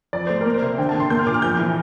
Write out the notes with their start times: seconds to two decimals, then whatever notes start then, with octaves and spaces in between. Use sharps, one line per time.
0.13 F2 D5
0.27 A3 C5
0.41 A#3 A#4
0.54 C5
0.62 C3
0.78 D3 G5
0.89 A5
0.95 D3
1.00 C6
1.10 A#3 G6
1.19 F6
1.27 A#2 D6
1.34 F6
1.42 F2 G6
1.59 E3